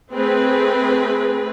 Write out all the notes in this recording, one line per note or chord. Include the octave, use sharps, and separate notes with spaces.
A3 C4 G#4 B4